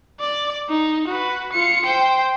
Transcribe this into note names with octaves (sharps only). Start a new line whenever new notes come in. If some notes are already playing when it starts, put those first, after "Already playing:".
D5
D#4
F#4 B4
F4 C#7
C5 G5